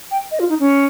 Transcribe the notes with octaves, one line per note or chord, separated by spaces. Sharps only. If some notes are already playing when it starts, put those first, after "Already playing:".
G5
D#5
F4
D#4
C#4